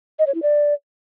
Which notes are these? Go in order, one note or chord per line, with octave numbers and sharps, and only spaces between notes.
D#5
C#5
E4
D5